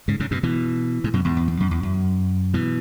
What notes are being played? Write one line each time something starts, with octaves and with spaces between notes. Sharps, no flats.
G#2 C#3
G#2 C#3
F#2 B2
B2 E3
G#2
F#2 B2
E2 G#2
E2
E2
F#2
E2
F#2
B2 E3